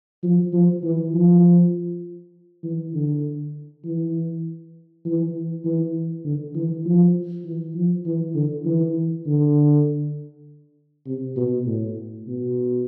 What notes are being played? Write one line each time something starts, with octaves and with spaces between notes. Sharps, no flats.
F3
F3
E3
F3
E3
D3
E3
E3
E3
D3
E3
F3
E3
F3
E3
D3
E3
D3
C3
B2
A2
B2